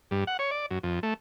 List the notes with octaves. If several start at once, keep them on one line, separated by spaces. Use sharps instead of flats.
G2
F#5
C#5
D5
F#2
F2
A3